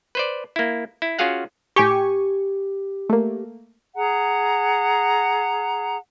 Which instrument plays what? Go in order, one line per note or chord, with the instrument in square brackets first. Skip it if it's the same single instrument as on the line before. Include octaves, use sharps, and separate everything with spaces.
[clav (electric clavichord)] B4 C5 D5
A#3 E4
E4
C#4 F4 F#4 G#4 F5 F#5
[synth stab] A2 G#5 C#6 [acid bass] G4
[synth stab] A3 A#3
[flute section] G#4 F#5 A#5